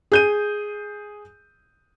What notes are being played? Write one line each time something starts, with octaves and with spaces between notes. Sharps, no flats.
G#4 G6 D#7